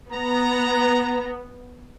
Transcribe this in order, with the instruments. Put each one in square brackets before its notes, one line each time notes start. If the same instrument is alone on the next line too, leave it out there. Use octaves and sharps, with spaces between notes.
[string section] B3 [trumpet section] A#5